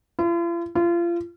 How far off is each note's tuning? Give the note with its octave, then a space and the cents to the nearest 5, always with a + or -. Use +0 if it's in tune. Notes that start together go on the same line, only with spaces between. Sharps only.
F4 -45
F4 -30